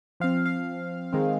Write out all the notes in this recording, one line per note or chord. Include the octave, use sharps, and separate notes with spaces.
F3 C4 F5
F5
D#3 G#3 C4